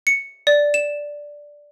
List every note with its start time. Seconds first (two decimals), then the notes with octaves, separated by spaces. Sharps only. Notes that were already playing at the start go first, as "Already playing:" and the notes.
0.07 C#7
0.47 D5
0.74 E7